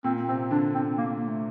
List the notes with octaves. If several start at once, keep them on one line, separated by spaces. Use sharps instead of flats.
A#2 C4
C3 C4
D3 D4
C4
A#3
A3